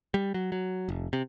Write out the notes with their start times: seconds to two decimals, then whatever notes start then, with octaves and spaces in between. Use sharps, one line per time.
0.14 G3
0.34 F#3
0.52 F#3
0.89 F1
1.13 C3